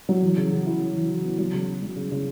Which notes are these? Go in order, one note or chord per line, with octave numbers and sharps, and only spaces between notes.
F#3
E3
C#3
C#3
E4
E4
E3
E3
B3
F#3
C#3
C#3
F#3
C#3
C#3